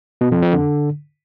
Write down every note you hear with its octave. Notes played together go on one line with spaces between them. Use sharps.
B2
F2
F2
D3